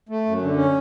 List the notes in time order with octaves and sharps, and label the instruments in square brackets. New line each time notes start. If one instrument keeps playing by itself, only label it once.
[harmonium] A3
F#2
D3
C#4